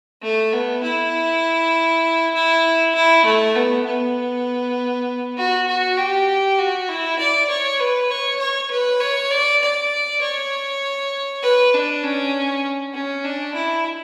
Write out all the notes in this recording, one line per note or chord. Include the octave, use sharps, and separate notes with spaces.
A3
B3
E4
E4
E4
A3
B3
B3
F#4
F#4
G4
F#4
E4
D5
C#5
B4
C#5
C#5
B4
C#5
D5
D5
C#5
B4
D4
C#4
C#4
D4
E4